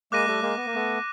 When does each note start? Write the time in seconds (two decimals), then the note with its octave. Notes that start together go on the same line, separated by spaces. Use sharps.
0.12 G#3 A#3 D6 F#6 A#6 D#7
0.27 G3 A3
0.42 G#3 A#3
0.57 B3
0.66 A#3
0.75 A3 B3